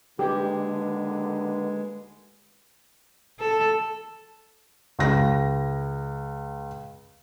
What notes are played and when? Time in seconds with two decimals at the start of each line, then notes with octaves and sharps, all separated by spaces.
0.19 D#2 D3 G#3 G4 B4
3.40 A4
4.99 C#2 A#6